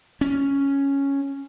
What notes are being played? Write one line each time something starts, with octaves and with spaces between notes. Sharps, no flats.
C#4